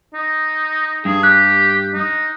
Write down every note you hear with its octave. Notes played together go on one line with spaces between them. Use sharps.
D#4
G2 G#4
G4 F#6
D#4